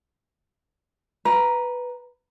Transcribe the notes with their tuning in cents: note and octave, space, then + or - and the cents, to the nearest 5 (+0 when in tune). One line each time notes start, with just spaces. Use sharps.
B4 +0 A#5 +10